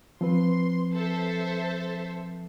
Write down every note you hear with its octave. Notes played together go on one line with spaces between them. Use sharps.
F3 C4 B4 C6
A4 C5 E5